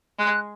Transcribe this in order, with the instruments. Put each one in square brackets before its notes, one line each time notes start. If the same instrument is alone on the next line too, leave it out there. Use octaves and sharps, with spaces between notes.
[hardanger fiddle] G#3 [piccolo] F#6